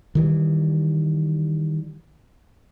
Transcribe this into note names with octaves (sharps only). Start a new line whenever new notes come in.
D#3 E3 G3